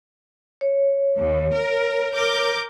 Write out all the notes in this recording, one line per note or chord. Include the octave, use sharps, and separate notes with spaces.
C#5
D#2
A#4
A#4 D6 G6